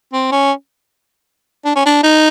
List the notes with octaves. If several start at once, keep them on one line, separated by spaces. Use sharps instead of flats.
C4
C#4
D4
C#4
D4
D#4